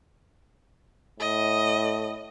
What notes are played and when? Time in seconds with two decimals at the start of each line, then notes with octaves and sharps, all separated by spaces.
1.20 A2 D#5